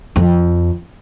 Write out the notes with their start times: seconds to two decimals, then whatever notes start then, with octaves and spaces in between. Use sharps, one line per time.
0.16 F2